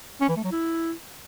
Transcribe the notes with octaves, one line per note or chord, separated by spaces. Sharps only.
C#4
E3
A3
F#3
E4